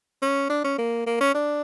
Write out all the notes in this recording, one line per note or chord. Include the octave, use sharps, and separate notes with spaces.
C#4
D4
C#4
A#3
A#3
C#4
D4